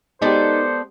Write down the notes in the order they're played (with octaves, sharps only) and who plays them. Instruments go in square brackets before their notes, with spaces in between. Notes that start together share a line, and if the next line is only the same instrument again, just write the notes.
[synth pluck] G#3 G4 [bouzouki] B3 A4 D5 [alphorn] D#4 [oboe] C5